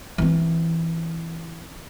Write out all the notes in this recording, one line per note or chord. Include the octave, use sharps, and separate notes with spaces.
E3 C4